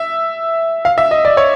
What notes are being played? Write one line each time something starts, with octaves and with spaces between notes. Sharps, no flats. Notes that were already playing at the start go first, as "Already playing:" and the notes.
Already playing: E5
F5
E5
D#5
D5
C#5